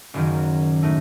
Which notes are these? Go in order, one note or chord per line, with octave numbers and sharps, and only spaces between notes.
F#1 F#2 D#3 F#3
A2 A3 D#4